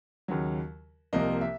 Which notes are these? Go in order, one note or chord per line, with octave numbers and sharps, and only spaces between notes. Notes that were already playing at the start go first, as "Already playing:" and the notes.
D#2 C#3 F#3
C2 C3 F3 A#3 D#5
E5